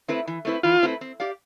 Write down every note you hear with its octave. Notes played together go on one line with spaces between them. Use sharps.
A3 C4 E4 B4
E3
A3 C4 E4 B4
E3 F4
A3 C4 E4 B4
C4
G4 D5 F5